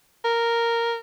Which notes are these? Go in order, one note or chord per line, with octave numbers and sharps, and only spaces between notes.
A#4